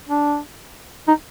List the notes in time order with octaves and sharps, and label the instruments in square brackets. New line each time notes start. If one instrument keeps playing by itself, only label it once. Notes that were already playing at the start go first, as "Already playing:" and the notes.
[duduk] D4
D#4